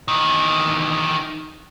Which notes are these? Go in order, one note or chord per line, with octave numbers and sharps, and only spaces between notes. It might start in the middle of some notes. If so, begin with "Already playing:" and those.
D#3 E3